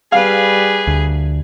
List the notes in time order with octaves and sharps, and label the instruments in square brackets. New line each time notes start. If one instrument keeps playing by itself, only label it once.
[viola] G3 B4 [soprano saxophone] G#4 [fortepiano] F5
[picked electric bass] D2